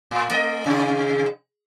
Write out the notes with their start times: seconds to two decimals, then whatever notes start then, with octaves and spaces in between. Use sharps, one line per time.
0.11 A2
0.31 A3 D#5
0.66 C3 D#3 G#4